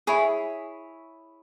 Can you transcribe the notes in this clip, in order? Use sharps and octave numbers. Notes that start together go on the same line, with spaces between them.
E4 G#4 C#5 B5